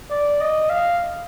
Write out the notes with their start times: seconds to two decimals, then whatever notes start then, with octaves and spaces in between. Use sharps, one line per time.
0.11 D5
0.41 D#5
0.70 F5